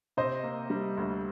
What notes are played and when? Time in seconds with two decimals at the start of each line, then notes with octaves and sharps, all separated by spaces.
0.17 C3 C5 D#5
0.43 A#3
0.70 G3
0.97 D2